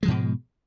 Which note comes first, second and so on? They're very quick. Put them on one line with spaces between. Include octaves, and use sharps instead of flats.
G#3 F3 G#2 B2